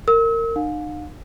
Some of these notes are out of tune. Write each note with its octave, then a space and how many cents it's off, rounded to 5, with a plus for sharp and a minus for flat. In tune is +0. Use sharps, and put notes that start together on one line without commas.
A#4 -25 E6 -40
D#4 -40 F5 +35